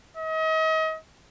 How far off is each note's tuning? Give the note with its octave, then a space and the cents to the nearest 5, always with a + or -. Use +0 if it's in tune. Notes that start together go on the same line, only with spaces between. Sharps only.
D#5 +35